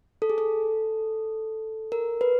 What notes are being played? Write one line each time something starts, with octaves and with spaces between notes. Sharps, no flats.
A4
G#4
A4
A#4
B4